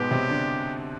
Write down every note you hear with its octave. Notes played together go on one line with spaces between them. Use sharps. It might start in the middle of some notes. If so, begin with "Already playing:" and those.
Already playing: G#2 B2 G#3 B3 G4
C3 C4
D3 D4